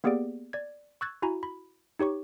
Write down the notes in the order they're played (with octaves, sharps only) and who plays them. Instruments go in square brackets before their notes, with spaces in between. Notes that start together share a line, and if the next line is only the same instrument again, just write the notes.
[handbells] A#3 B3 G4 G#4 D5 D7
D5 G#6
C#6 E6 F#6 G#6 A6
E4 F#4 G#5 A#5 B5
B5
D#4 G4 C#5 C#6